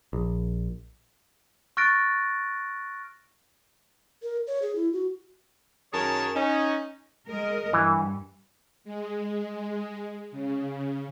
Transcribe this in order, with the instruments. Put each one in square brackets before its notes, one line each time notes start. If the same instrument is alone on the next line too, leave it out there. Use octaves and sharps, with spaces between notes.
[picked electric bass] A#1
[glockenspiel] C#6 F6 F#6 A6 A#6 D7
[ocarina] A#4
C#5
G#4
E4
F#4
[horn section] F#2 D#3 G#4 A#4 C#5 A5
C#4 D#4
[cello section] G#3 A#4 D#5
[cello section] G2 [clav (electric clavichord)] E3
[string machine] G#3
C#3